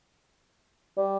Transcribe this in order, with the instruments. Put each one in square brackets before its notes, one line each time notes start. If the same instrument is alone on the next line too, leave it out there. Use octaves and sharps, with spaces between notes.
[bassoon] G3